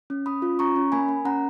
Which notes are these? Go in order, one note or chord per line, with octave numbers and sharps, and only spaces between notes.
C#4
C#4 B5 D#6
F4
C#4 A#5 C#6
C#4
A#3 G#5 B5
A#3
C#4 F#5 A#5